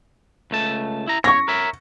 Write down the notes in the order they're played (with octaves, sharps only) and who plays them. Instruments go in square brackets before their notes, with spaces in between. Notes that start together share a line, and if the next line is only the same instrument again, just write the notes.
[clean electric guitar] C#2 A3 A5
E4 A#5
[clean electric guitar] C#5 [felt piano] C#6 A#6
[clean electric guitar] A#4 C#5 E5